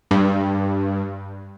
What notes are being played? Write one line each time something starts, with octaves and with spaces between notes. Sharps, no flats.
G2